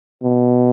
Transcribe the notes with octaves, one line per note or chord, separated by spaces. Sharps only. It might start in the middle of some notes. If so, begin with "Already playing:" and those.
B2